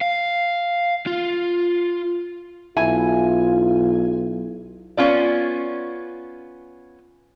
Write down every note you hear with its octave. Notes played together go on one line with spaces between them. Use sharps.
F5
F4
B1 E4 F4 G#5
B3 C#4 F4 D5